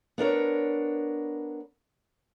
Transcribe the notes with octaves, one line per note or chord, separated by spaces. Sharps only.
B3 D4 A#4 C#5